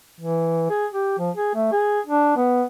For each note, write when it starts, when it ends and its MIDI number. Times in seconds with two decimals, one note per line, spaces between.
0.20 0.69 52
0.70 0.86 68
0.92 1.16 67
1.19 1.30 53
1.36 1.52 68
1.55 1.69 57
1.72 2.00 68
2.06 2.34 62
2.36 2.64 59